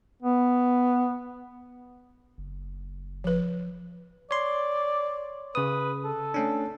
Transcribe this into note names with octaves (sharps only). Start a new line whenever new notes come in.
B3
F#1
F3 B4
C#5 D5 C6
C#3 B4 D#6
A4
A3 C#4 D4